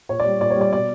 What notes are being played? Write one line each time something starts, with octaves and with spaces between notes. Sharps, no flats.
A#2 C#5
D5
G3
A#2 D5
C#5
G3
D5
B2 D5